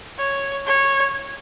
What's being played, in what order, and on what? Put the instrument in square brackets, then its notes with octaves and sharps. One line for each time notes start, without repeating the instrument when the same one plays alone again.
[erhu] C#5
C#5